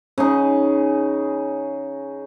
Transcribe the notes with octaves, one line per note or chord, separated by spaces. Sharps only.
C#3 D#4